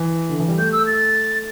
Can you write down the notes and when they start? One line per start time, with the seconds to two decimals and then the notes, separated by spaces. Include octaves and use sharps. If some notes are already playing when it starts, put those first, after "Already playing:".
Already playing: E3
0.29 D3
0.40 E3
0.48 G3
0.58 A3 G6
0.72 E6
0.87 A6